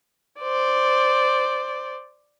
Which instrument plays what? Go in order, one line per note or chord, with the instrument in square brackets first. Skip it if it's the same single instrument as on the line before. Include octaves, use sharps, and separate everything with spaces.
[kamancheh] C5 D5